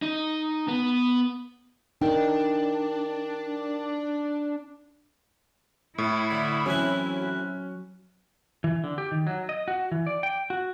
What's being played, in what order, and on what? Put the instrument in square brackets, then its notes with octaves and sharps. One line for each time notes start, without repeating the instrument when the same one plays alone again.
[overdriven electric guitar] D#4
B3
[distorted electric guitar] D4 [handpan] D#4 [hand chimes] A#4 G5
[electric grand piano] A2 [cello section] E4
[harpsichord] D3
[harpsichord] A2 C4 G#5 [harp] E3 F#3 F#4 [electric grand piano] C#4
[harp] F#4
[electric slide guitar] E3
D3
G4
D#3
F#3
D#5
F#4
E3
D5
G5
F#4